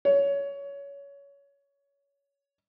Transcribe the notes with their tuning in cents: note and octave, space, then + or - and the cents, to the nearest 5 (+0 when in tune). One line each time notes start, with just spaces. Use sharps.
C#5 +20